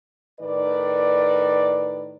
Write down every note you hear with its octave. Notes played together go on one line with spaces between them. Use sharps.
A2 D#3 B4 D5